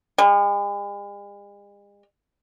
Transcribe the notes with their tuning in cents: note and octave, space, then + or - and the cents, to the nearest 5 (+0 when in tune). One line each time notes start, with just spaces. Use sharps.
G#3 -45